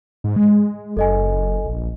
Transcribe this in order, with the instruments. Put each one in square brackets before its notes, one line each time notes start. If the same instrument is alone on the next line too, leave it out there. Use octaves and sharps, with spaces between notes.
[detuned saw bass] G#2
G#3
[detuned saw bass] F#1 [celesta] A4 D#5 G#5
[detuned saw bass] A#1